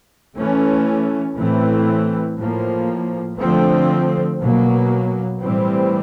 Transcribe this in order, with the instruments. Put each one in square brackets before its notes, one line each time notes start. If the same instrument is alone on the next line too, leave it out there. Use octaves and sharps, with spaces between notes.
[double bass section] E3 A3 C#4
A2 E3 A3 C4
A2 F3 A#3
D3 F3 A3 C4
B2 F#3 A#3
A2 E3 G3 C4